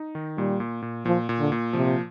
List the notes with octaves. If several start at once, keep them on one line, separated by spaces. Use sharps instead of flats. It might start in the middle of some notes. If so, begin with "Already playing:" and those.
Already playing: D#4
D#3
A#2 G3
A#2
A#2
A#2 F3
A#2
D3
A#2
C3 F3